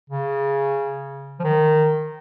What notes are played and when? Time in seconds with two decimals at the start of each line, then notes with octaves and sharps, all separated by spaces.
0.10 C#3
1.39 F3
1.43 D#3